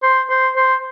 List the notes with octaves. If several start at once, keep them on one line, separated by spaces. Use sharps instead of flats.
C5
C5
C5